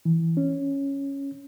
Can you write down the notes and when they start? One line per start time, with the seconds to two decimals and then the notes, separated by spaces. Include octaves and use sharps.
0.05 E3
0.37 C#4